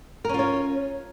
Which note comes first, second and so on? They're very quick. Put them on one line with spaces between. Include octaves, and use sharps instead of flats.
A#4 C#4 F4 C#5